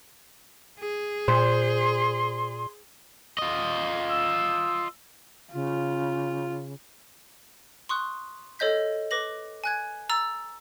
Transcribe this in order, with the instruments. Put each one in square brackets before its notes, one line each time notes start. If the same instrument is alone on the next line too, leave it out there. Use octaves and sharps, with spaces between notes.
[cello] G#4
[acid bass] A#2 [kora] C5 [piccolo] C6
[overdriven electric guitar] F4 D#5
[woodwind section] E6
[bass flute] C#3 [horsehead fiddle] F4
[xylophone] C6 C#6 D#6 F#6
A4 C#5 D#5 G6 B6
B4 D6 A#6 F#7
G#5 F#6 G#6
A#5 E6 A6